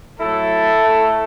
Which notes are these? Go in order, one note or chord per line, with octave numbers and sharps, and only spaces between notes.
A2 F#3 A3 E4 A4
A2 A3